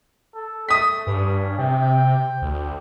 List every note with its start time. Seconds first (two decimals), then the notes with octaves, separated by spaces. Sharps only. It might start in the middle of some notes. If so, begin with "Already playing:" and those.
0.35 A4
0.69 A3 D#6 B6
1.07 G2 C#4
1.58 C3 G5
2.42 D2